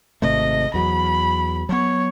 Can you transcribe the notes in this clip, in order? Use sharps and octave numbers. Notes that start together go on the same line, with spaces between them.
G#1 C3 A3 D#5
E2 F#3 B5
F#3 B3 C#5